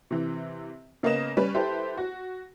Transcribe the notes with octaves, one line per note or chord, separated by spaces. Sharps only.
C3 E3
C#3 A#3 B3 D#5 E7
G3 C#4 B4
E4 G4 A4 B4 C5
F#4